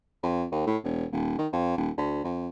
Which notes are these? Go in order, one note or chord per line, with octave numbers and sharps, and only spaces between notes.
F2
D#2
A2
E1
D#1
D#3
F2
D#1
D2
F2